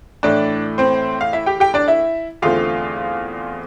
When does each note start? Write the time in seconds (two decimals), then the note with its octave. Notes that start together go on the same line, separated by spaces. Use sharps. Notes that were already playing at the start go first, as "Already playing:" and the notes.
0.23 A2 E3 A3 D4 D5
0.78 C4 C5
1.21 F5
1.33 E4 E5
1.46 G4 G5
1.60 G4 G5
1.74 D4 D5
1.88 E4 E5
2.42 E2 D3 A3 C4 F4 F5